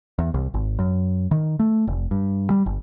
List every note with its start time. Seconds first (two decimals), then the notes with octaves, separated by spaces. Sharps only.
0.19 E2
0.34 C2
0.54 G#1
0.79 F#2
1.31 D#3
1.59 A3
1.88 F1
2.11 G2
2.50 G3
2.66 G1